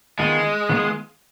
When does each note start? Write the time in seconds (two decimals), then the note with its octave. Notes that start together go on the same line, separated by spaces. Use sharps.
0.19 D#3 G#3 B3 F4 G#4
0.69 D#3 B3 F4 G#4